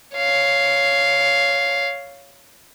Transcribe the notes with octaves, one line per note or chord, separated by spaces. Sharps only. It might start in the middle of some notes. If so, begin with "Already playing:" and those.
C#5 F5